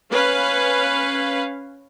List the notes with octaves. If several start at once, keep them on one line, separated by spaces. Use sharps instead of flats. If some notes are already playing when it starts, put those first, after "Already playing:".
C#4 B4 F5